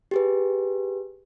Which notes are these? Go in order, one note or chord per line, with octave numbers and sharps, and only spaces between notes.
G4 G#4 B4